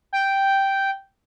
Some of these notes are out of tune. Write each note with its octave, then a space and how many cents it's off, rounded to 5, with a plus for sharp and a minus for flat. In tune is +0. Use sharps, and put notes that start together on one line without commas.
G5 -5